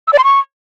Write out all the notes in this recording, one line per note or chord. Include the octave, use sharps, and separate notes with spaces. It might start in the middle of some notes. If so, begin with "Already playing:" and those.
E6
D5
C6
C#6